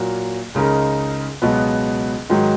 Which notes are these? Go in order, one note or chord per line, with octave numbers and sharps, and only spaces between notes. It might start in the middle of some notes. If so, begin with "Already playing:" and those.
Already playing: A#2 F#3 A#3
C#2 C#3 G#3 D#4 A#4
C#2 B2 F#3 B3
G#2 D#3 F#3